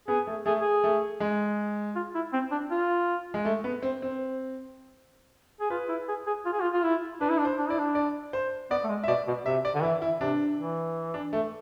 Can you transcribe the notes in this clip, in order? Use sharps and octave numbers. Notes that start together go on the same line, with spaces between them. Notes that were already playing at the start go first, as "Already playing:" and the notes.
B3 G#4
A3
A3 G#4
G#4
A3
G#3
F4
E4
C4
D4
F4
G#3
A3
B3
C4
C4
G#4
F4 B4
E4
G#4
G#4
F4
G#4
F4
F4
E4
D4 B4
E4
D4
C5
D4
E4 D5
D4
D5
C5
B3 D5
A3
G#3
E5
B2 D5
B2
C3 E5
D5
D3
E3 E4
E4
C3 D4
E3
D4
A3